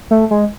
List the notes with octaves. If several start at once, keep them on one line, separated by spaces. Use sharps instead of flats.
A3
G#3